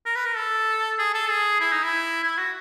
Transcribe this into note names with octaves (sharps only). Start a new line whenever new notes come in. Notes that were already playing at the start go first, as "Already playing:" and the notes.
A#4
B4
A#4
A4
G#4
A4
G#4
E4
D#4
E4
E4
F#4